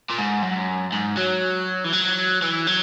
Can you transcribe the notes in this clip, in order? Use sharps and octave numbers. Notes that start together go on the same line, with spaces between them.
A#2
G#2
F#2
G#2
F#3
E3
F#3
E3
F#3